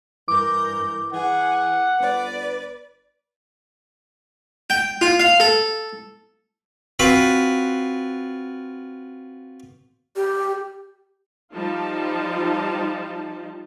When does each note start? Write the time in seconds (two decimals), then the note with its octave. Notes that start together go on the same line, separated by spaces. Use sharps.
0.28 G2 E3 A#4 D6 G6
1.13 E3 G#4 F#5
2.00 G1 B4 D5
4.70 G5
5.01 F4
5.20 F5
5.40 A4
6.99 C4 F4 F#4 B4
10.16 G4
11.53 F3 G3 D#4 F4 A5